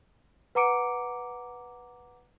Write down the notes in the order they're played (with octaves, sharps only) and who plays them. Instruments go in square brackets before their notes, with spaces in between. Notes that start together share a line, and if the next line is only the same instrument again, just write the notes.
[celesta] B4 F#5 A#5 D6 C#7 D7